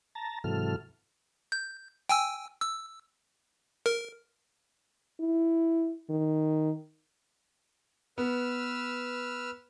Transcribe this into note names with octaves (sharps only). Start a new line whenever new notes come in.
A5 A#5
G#2 C3 E3 F#3 A4 F6
G6
G5 G#5 E6
E6
A#4
E4
D#3
B3 B4 E6 F6